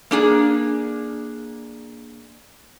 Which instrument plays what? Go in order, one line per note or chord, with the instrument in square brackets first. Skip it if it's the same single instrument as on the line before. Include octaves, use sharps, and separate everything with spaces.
[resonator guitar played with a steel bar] A#3 D4 G#4